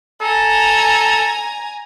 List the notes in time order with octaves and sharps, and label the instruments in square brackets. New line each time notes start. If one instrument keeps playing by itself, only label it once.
[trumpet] A4 [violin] G#5 A#5